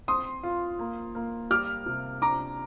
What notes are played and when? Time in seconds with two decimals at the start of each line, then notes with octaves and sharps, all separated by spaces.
0.08 C4 C6 D#6
0.43 F4
0.79 A#3
1.15 A#3
1.50 G3 D6 F6
1.86 C3
2.21 D4 A#5 D6